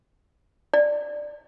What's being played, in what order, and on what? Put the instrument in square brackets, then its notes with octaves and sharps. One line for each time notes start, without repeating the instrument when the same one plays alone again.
[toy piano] D5